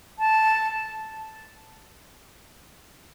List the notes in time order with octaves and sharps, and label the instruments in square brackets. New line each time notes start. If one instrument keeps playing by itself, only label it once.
[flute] A5